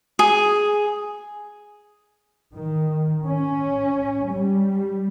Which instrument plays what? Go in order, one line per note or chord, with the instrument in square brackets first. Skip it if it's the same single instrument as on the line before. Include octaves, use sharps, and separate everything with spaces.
[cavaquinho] G#4
[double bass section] D#3
C#4
G3